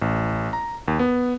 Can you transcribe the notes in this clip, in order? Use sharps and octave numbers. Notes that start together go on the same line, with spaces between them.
A1
A#5
D#2
B3